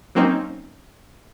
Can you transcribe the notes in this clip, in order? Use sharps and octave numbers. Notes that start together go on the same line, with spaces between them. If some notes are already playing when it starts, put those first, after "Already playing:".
F#3 A#3 C4 C#4 D#4